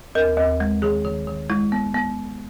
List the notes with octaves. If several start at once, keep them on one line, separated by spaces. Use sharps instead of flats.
D#2 A#4
D#2
G#3
D#3 G#4
D#3
D#3
G#3 E4
B3
B3